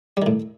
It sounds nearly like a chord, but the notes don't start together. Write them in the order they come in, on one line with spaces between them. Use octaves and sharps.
G3 D#3 A2